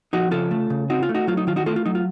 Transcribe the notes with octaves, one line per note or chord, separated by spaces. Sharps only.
F3 D#4 F#4
C#3 F4 A4
A3
C#3
C4 D#4 F#4
F4
A3
D#4 F#4
F#3 F4
D#4
D#3 F4
D#4 F#4
A3 F4 A4
F4
F#3 D#4
F4